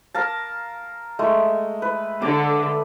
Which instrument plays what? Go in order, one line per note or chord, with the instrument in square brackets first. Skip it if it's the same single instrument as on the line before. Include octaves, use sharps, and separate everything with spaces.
[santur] A#4 F5 A5
G#3 A3
B4
[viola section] D3 A4 [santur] D6